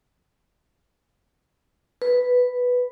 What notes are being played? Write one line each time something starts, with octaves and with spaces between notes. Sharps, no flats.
B4